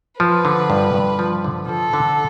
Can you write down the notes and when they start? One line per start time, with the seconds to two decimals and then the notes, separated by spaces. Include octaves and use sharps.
0.20 F3 B4
0.45 D3
0.70 G2
0.94 G2
1.19 F3
1.44 D3
1.69 F3 A4
1.93 D3